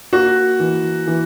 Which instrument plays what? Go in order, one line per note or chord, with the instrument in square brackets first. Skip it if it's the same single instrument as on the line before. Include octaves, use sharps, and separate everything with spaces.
[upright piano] A#3 [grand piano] F#4
[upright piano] E3
E3